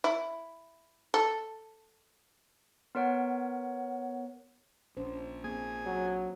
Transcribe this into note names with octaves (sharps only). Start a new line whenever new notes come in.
E4
A4
B3 A#4 C#5 F#5
A#1 C#4 C5
A#3 C4 G#4 G#5
F#3